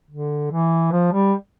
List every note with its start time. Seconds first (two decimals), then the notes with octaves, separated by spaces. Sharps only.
0.10 D3
0.52 E3
0.92 F3
1.12 G3